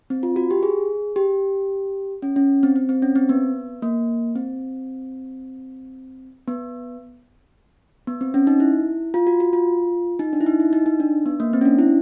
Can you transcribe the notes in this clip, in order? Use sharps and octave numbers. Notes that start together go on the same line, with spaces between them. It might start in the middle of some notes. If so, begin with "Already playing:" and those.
C4
F4
F#4
G4
G#4
G4
C#4
C#4
C4
C4
C4
C#4
C4
B3
A#3
C4
B3
B3
C4
C#4
D#4
E4
F4
F#4
F#4
F4
D#4
D4
E4
D#4
E4
D#4
D#4
D4
B3
A#3
C4
C#4
D4
E4